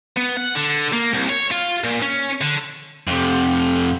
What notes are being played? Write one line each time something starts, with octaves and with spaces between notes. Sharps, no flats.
B3
F#5
D3
A#3
C2
C#5
F4
A#2
C#4
D3
F2 C3